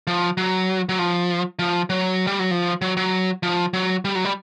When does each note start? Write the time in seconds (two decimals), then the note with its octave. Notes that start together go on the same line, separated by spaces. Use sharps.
0.07 F3
0.37 F#3
0.89 F#3
0.99 F3
1.59 F3
1.90 F#3
2.27 G3
2.39 F#3
2.51 F3
2.82 F#3
2.97 F#3
3.43 F3
3.73 F#3
4.05 G3
4.15 F#3
4.25 G3